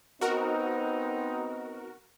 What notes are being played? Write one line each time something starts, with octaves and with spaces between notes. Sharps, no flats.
B3 C4 D#4 F#4 A#4